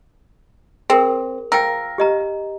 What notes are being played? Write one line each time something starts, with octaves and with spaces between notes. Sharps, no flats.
C4 G#4 A#4
F3 A#4 G5 E6
G4 D#5 A#5